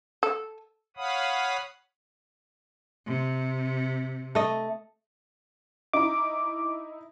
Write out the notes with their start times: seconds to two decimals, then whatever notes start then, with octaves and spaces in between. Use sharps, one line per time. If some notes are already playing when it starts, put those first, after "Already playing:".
0.23 A4
0.97 C#5 F5 F#5 B5 D#6
3.07 C3
4.35 A3 D#5
5.93 D#4 E4 A#5 D6